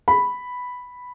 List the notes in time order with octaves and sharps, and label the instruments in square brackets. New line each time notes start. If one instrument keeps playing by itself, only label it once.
[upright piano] B5